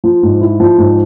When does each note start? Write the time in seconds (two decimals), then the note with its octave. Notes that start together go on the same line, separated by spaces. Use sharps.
0.04 F3
0.23 G#2
0.41 E4
0.60 F3
0.78 G#2